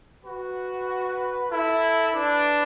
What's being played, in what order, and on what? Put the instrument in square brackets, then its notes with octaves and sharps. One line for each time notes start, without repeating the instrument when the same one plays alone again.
[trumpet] F#4 [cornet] B4
[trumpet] E4 [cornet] A4
[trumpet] D4 [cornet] B4